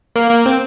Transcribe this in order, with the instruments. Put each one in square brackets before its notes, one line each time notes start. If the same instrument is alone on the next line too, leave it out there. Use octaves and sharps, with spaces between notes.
[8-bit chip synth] A#3
A#3
C4